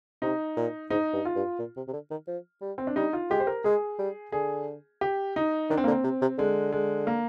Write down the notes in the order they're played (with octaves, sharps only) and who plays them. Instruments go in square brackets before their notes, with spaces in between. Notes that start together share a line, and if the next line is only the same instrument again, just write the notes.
[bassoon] C3 [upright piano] D#4
[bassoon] A#2
[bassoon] G#2 [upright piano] D#4
[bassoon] G2
[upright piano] F4
[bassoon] G2
A#2
C3
C3
D3
D#3
F3
G3
[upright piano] C4
D4
[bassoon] G3 [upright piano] D#4
[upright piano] F4
[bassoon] G#3 [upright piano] G4
[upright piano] C5
A#4
[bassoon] G#3 [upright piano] G#4
[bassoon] G3
[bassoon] D3 [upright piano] G#4
[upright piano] G4
D#4
[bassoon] D#3 [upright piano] D4
[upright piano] C4
A#3
[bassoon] D3
[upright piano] C4
[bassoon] C3
C3
[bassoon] D3 [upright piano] G#3
[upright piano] G#3
A#3